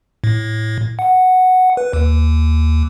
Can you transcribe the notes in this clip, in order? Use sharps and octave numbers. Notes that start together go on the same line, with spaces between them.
A2
F#5
B4
D#2